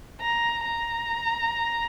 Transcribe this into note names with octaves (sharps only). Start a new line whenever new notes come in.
A#5
A#5